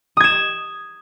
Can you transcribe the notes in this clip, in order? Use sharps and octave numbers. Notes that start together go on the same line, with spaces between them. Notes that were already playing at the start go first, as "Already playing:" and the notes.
D#6 G#6 E7